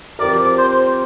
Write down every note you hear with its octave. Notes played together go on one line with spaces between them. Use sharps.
F3 C4 G4 A#4 D5
C5